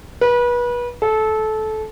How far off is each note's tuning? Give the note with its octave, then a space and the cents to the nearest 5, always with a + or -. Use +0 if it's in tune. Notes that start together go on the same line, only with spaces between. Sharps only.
B4 -30
A4 -20